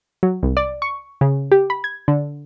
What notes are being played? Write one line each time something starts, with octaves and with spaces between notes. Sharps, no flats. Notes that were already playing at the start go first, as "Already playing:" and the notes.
F#3
C2
D5
C#6
C#3
G4
B5
G#6
D3